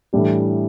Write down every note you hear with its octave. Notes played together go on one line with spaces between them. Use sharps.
A2 E3 G3 D4 G4